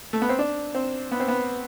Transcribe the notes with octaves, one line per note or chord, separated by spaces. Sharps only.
A3
B3
C4
D4
C4
B3
C4
B3